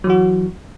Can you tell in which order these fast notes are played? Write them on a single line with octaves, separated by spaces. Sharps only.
F#3 E3 F#4